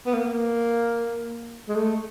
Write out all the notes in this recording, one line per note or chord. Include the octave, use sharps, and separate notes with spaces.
B3
A#3
G#3
A3